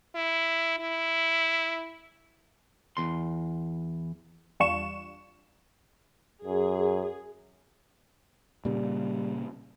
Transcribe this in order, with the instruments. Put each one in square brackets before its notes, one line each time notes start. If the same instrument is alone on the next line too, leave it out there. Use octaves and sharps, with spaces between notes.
[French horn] E4
E4
[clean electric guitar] E2 C6
[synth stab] E2 G3 D4 F4 C#6 E7
[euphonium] F#2 [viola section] G#4
[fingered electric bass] A#2 C#3 [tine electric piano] G3